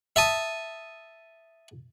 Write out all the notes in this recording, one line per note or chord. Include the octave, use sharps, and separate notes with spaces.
E5 A5 D#6